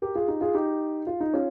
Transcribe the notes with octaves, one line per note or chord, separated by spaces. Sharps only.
G4 A#4
F4 G#4
D#4 G4
F4 G#4
D#4 G4
F4
D#4
C#4 F4